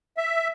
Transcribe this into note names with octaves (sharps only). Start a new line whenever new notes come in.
E5